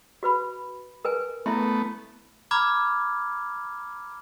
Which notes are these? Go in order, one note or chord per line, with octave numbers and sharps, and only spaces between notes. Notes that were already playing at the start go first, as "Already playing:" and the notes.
F#4 B4 B5
A#4 B4 G#5
A3 B3 E4 E5 C6
A#5 B5 D6 F6 G#6